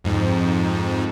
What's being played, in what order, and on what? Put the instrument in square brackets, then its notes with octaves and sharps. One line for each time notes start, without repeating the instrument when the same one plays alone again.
[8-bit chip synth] F2 G#2